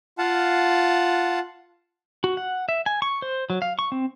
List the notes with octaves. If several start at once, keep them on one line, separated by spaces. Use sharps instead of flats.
F4 F5 F#5 A5
F#4
F#5
E5
G#5
C#6
C5
F#3
F5
C#6
C4